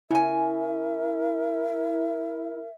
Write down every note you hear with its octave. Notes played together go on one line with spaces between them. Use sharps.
C#3 E4 A#4 E5 G#5